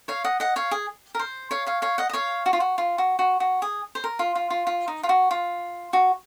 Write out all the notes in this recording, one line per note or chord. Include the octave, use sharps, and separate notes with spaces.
C#5 F5
D#5 F#5
D#5 F#5
C#5 F5
G#4
A#4
C5
C#5 F5
C#5 F5
C#5 F5
D#5 F#5
D#5
C#5 F5
F#4
F4
F#4
F4
F#4
F#4
F#4
G#4
C5
A#4
F4
F4
F4
F4
D#4
F4
F#4
F4
F#4